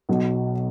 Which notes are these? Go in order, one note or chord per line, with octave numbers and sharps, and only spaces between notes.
B1 B2 F#3